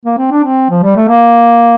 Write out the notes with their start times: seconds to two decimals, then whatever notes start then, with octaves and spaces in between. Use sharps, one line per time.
0.05 A#3
0.18 C4
0.31 D4
0.44 C4
0.70 F3
0.83 G3
0.96 A3
1.09 A#3